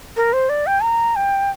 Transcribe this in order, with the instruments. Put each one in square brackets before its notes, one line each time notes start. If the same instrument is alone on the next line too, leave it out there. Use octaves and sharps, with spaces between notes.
[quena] A#4
C5
D5
G5
A#5
G5